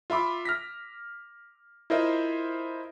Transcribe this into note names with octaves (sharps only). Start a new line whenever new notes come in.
F4 E5 B5 D6 E6
F6 A#6 B6
E4 F4 A#4 C5 D#5 E5